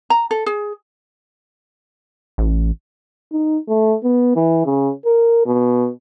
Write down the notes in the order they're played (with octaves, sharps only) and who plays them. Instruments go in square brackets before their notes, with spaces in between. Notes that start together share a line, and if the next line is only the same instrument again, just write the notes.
[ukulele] A#5
A4
G#4
[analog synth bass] A1
[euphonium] D#4
A3
B3
E3
C#3
A#4
B2